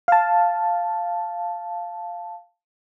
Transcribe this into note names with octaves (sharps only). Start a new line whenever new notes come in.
F5 A5